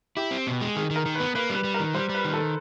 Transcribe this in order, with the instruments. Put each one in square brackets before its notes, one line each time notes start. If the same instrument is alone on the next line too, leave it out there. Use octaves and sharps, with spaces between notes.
[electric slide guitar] E4 [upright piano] G4
[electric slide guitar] C4
B2
G#3
[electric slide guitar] D#3 [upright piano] G#4
[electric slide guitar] D#3
[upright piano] A#4
[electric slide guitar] D#3
[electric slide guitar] B3 [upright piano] B4
[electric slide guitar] A#3 [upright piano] B4
[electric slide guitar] G3 [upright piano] B4
[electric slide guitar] G3
[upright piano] A#4
[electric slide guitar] D#3
[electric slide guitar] G3 [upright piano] C5
[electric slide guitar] G3
[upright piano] B4
[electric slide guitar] D#3
[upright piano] A4